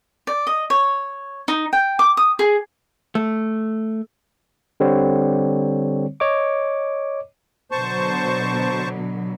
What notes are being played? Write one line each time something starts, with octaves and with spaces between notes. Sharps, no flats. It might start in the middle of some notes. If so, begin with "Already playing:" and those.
D5
D#5
C#5
D#4
G5
D6
D#6
G#4
A3
D3 G3 C4 C#5
C#5 D#5 D6
B2 D3 F#3 C5 A5 C#6